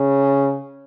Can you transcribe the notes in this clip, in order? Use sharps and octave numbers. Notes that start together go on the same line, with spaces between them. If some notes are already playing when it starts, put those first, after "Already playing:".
Already playing: C#3